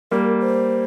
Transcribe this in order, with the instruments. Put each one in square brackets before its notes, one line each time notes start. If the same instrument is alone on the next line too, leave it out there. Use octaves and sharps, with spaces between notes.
[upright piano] G3 A#3 [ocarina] A#4
[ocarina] C5